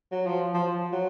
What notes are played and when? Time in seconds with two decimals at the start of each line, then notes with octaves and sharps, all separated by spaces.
0.12 F#3
0.26 F3
0.54 F3
0.93 F#3